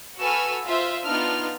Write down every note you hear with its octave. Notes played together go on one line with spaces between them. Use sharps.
F#4 A4 B4 G#5 E6 F6
F4 C5 E5 F5
B3 D4 D#4 F4 F6